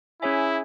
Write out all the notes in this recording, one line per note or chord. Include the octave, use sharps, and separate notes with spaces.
C#4 E4 G#4 C#5 E5 G#5